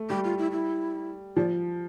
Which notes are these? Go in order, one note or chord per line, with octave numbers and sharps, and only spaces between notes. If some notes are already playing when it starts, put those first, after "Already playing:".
Already playing: A3
G3 G4
F4
E4
E4
F3 D5